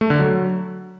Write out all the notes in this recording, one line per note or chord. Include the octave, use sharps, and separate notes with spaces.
A3
D3
F#3